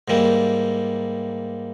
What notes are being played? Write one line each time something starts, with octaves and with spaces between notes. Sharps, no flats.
G#2 E3 G3 A#3